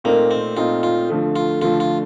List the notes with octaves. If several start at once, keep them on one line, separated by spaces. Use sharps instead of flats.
A#2 A3 A#3 C4 D#4
C4
A#2 A3 C4 D#4 F4
F4
D3 F3 A3
F4
D3 F3 A3 F4
F4